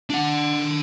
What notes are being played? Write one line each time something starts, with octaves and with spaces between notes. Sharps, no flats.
D4 F#5